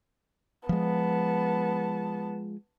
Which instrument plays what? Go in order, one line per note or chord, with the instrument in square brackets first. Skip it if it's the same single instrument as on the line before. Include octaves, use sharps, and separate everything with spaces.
[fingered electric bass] F3 G#3 [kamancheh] B3 A5